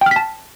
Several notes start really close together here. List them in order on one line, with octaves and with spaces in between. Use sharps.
G5 F6 B6 A5